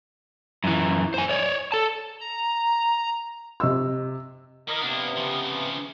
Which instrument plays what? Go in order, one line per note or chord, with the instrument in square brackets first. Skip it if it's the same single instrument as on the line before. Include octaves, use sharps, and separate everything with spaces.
[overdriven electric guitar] F#2 E3
C5 G#5
C#5 D5
A4 A5
[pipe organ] A#5
[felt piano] C3 D#5 E6
[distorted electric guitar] E3 [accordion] A#4 D#5
[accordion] C3 B3 [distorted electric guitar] A#3 D4
[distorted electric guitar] C#3 F3